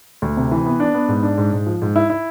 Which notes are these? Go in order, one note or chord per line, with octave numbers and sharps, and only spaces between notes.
D2
C3
E3
B3
D4
B3
G#2
D4
G#2
G#2
F3
G#2
E4
E4